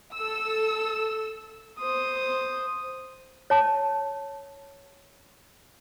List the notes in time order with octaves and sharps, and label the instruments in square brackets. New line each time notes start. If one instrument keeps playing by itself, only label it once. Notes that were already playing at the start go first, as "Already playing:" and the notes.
[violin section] A4 E6
[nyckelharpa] C5 D#6
[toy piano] C#5 A5